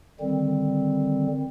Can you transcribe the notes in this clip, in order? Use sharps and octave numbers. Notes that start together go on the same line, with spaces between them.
D3 D#3 G3 C4